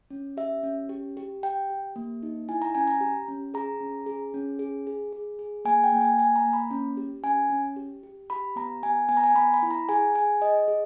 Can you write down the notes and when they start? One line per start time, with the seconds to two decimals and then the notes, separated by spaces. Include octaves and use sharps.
0.10 C#4
0.37 G4 E5
0.63 C#4
0.89 G4
1.17 G4
1.43 G4 G5
1.70 G4
1.96 A#3
2.23 D#4
2.48 E4 G#5
2.62 A#5
2.75 C#4 G#5
2.87 A#5
3.01 G4
3.28 C#4
3.54 G#4 A#5
3.81 C#4
4.06 G#4
4.34 C#4
4.59 G#4
4.87 G#4
5.13 G#4
5.39 G#4
5.65 A#3 G#5
5.84 G5
5.92 A#3
6.01 G#5
6.18 A#3 G#5
6.36 A#5
6.45 A#3
6.53 B5
6.71 C#4
6.97 G4
7.24 C#4 G#5
7.50 C#4
7.76 G4
8.03 G4
8.30 G4 B5
8.56 B3 A#5
8.83 B3 G#5
9.09 B3 G#5
9.17 A#5
9.24 G#5
9.35 B3 B5
9.54 B5
9.63 E4
9.71 A#5
9.89 G#4 G#5
10.14 G#4 G#5
10.42 G#4 D#5
10.68 G#4